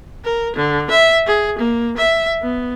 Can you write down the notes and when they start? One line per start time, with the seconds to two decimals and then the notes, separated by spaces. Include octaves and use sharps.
0.24 A#4
0.56 D3
0.90 E5
1.27 G#4
1.58 A#3
1.97 E5
2.42 B3